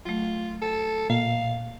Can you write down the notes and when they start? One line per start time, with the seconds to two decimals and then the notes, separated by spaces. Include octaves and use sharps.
0.06 F#3 A3 F4
0.62 A4
1.10 A#2 A#3 F5